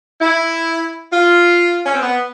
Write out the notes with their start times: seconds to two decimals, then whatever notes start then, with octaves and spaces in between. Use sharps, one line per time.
0.21 E4
1.12 F4
1.86 C#4
1.94 C4
2.02 B3